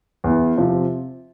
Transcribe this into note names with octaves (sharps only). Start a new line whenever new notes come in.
E2
C3 F3